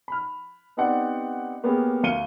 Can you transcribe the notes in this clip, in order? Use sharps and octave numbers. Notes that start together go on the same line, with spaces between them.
B5 F6
B3 C4 D#4 G4 D5 F#5
A#3 B3 C#4 G4 G#4
D2 F5 F6 C#7 D#7 G7